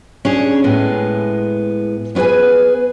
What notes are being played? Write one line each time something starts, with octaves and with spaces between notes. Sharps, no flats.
C#4 D4 G#4
A2 G#3 B3
B3 C#4 G#4 B4 G#5